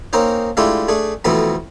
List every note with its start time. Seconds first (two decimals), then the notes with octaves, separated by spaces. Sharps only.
0.13 A#3 C4 C#4 D#4 C5
0.57 G#3 A3 D4 E4 F4 G4
0.88 A3 D4 G#4
1.25 F2 B2 E3 A3 B3 C4